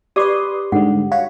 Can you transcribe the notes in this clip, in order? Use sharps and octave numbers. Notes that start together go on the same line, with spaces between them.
G4 B4 D5 C6 D6 D#6
G#2 D3 G3 F#5
F#4 C#5 F5